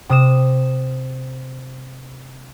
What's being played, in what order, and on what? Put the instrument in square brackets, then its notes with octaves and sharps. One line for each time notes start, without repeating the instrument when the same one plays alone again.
[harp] C3 D#6 E7